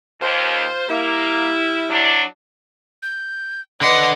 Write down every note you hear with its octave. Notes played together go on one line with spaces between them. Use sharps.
D#2 F4 C5
G3 A#3 E4
F#3 D4
G6
D3 B4 D5 D#5 F#5 C6 A#6